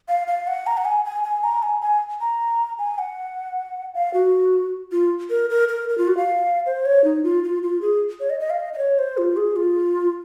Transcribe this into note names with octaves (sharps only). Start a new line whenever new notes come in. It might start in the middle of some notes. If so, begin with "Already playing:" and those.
F5
F5
F#5
A#5
F#5
G#5
G#5
G#5
A#5
G#5
G#5
A#5
G#5
F#5
F5
F#4
F4
A#4
A#4
A#4
A#4
F4
F#4
F5
C5
C#5
D#4
F4
F4
F4
G#4
C#5
D#5
D#5
F5
D#5
D#5
C#5
C5
F4
G#4
F4